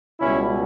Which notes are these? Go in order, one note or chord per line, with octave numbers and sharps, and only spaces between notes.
C#2 B2 G3 C#4 E4